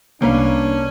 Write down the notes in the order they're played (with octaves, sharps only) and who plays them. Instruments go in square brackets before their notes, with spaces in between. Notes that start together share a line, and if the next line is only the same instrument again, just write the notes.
[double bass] C2 [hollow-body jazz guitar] A#3 B4 F5 [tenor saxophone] C#4 [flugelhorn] D4